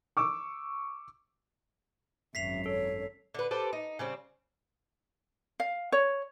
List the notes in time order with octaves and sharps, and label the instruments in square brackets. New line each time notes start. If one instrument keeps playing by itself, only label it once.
[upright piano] C#6 D6 E6
[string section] G#1 F#2 [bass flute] E5 [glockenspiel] B6 C7 F7
[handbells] A4 [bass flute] C#5
[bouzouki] D3 B4
G4 A4 B4 C5
D#4
C#3 G3 C4
[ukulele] F5
C#5